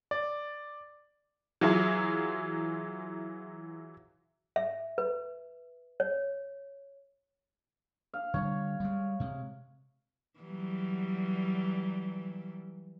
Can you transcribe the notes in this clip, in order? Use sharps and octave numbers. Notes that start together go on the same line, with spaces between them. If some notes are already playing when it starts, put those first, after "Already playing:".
D5
E3 F#3 E4 F4 G#4
E5
B4
C#5
F5
D3 G3 C#5
G3 G#3
C3 G#3
E3 F#3 G3